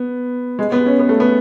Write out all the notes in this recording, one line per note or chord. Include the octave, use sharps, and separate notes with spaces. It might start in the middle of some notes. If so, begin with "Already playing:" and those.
Already playing: B3
G#3
B3
C#4
B3
A3
B3